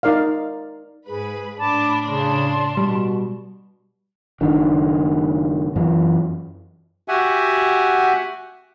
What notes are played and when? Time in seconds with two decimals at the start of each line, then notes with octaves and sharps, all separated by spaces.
0.03 D#4 A#4 D5 F5
1.06 G#2 G#4 B4
1.58 A2 D4 A5 B5 D6
2.07 C#3 A5 C6
2.77 B2 G3
4.41 F#1 D#3 D4
5.76 F#2 E3
7.08 F#4 G4 E5 F#5 G#5